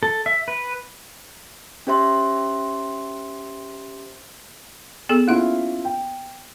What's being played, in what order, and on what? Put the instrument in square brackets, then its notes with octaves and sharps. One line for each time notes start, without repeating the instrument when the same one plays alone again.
[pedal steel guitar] A4
E5
B4
[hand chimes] C#4 G4 C5 E5 C6
[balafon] B3 G#4 A4
[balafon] A#3 F#5 [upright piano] C#4 E4 F4
[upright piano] G5